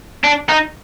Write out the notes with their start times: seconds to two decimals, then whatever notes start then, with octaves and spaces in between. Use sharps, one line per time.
0.24 D4
0.49 D#4